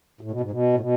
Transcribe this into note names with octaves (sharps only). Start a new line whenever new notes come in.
A2
B2
G#2
B2
A2
B2